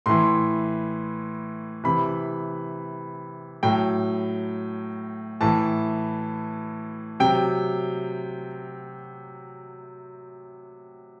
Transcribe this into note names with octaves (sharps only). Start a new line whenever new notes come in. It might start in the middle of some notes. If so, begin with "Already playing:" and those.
A2 E3 C6
C3 E3 B5
A2 F#3 G5
A2 E3 A5
C3 F#3 G5